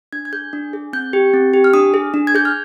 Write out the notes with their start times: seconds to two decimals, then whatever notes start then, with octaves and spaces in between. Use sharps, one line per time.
0.13 D4 G#6
0.25 G#6
0.33 G#4 G6
0.53 D4
0.73 G#4
0.93 C4 G6
1.13 G4
1.34 C4
1.54 G4
1.64 F6
1.74 D4 D#6
1.94 G#4
2.14 D4
2.27 G#6
2.35 G#4 G6
2.45 F6